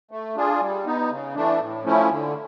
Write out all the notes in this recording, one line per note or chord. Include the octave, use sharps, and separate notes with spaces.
A3
D4 F4 G#4
G3
B3 D#4
C#3
E3 A3 D4
A2
F3 A3 C#4 E4
D3